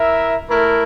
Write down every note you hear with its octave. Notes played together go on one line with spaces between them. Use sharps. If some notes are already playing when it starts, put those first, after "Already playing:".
Already playing: E4 A#4 E5
A3 E4 A#4